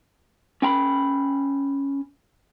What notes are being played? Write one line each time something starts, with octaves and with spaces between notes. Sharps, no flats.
C#4 G5 A#5 B5